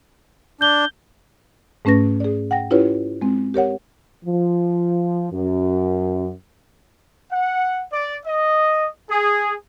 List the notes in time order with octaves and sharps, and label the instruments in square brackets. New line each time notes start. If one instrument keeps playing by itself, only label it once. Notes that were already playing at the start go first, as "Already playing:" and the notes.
[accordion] D4 [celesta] G6 G7
[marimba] G#2 A3 C#4 B4 A#6
G#4 D5
F#5 G5 A#6
C#4 E4 F4 G4 B4 C#5
G#3 C4
G4 A#4 C#5 F#5
[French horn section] F3
F#2
[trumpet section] F#5
D5
D#5
G#4